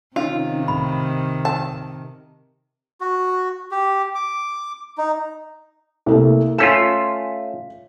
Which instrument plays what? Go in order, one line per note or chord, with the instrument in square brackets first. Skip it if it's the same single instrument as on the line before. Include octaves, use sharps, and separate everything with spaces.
[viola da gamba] C3 D#3 [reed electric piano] C#4 D#4 [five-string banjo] F4
[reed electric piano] C2 A2 [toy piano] B5
[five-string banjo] A5
[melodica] F#4
G4
D6
D#4
[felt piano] C2 A3 A#3
[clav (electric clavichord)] A3 C#4 F4 [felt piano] B6 E7